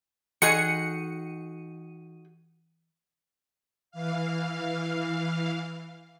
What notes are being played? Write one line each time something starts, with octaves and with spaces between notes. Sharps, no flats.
E3 D#4 F#4 G#4 C#7 D#7
E3 F5